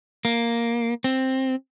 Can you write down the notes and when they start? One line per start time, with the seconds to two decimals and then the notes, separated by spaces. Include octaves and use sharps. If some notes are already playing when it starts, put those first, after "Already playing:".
0.25 A#3
1.04 C4